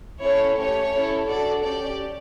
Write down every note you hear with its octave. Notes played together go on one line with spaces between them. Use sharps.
C#4 E4 A4 C#5
A3 C#4 G4 C#5
C#4 E4 A4
D4 F#4 A4 D5
C#4 G4 D5